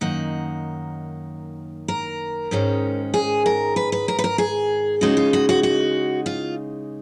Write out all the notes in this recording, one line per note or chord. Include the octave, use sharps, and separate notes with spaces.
F#2 D#3 A#3 D#4 F#5
A#4
G#2 D#3 G#3 C#4
G#4
A#4
B4
B4
A#4
B4
A#4
G#4
C#3 G#3 D#4 F#4
F4
F#4
F#4
F#4
F4